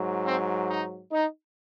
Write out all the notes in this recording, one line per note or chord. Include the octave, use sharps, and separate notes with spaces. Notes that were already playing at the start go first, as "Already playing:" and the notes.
Already playing: G#2 F#3
C4
D#4
D#4